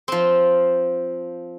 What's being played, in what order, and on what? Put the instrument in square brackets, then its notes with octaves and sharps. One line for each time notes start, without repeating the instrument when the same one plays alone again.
[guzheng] F3 C4